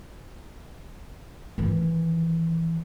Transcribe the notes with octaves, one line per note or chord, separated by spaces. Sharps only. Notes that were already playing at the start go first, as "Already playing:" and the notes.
D#3 E3